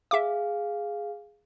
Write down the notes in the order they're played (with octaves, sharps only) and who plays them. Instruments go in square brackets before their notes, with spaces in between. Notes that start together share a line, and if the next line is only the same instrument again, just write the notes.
[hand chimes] G#4 F5 [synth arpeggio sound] E5 D6